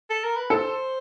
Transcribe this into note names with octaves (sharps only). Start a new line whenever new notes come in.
A4
A#4
B4
A4 C5